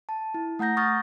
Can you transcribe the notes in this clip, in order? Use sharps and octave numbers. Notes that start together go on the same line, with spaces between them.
A5
E4
A3 F#5 A#5 G6 A#6
C#6 D#6 F6 G6 A6 A#6